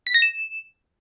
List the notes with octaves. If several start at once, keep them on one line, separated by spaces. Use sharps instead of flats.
B6
A#6
E7